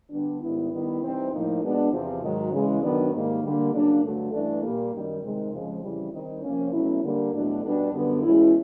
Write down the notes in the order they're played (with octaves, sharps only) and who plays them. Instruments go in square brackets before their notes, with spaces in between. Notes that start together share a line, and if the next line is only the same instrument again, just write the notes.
[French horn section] D3 G3 B3 D4
G#2 D#3 G3 B3 E4
D#3 G3 B3 E4
C3 E3 G3 C4 D#4
A2 F3 A#3 D#4
B2 G#3 B3 D4
E2 C3 F3
G#2 D#3 F#3
C#3 E3 G#3
F#2 D#3 F#3 B3 D4
G#2 D#3 G3 A#3
D3 G3 A#3
C#3 F#3 A#3 D4
G2 D3 F#3 A3
G2 E3 A3 D4
A#2 G3 A#3
F#2 D#3 G3
C3 D#3 G#3
F2 C#3 F3 G#3
F2 C#3 E3 G3
D#3 G3 C4 D#4
C3 F3 A#3 C#4
B2 F#3 A3 C#4 E4
D3 G3 A#3
E2 B2 F#3 A3 D4
B2 G3 B3 D4
F#2 D3 G3 B3
E2 B2 G#3 C#4 E4